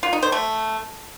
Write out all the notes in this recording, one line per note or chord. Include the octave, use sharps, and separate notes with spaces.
F4
D#4
C5
A3